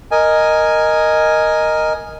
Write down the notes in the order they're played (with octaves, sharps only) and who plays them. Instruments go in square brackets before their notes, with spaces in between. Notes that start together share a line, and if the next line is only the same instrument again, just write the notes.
[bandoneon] A#4 D#5 G#5